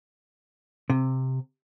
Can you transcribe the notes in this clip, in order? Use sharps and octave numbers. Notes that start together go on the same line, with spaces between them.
C3